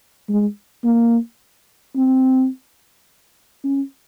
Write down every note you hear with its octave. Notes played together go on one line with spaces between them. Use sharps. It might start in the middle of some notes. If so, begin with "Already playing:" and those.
G#3
A#3
C4
C#4